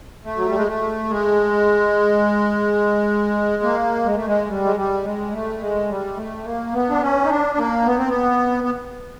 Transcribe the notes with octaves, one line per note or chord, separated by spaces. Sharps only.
A3
F#3
G3
G#3
A3
G#3
A#3
G#3
A3
G#3
G3
G#3
G3
G#3
A3
G#3
G3
A3
A#3
B3
D4
C#4
D#4
D4
A#3
B3
C4
B3
B3